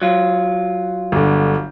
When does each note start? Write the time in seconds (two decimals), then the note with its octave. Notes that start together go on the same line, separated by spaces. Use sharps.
0.02 F#3 F4
1.12 G1 D3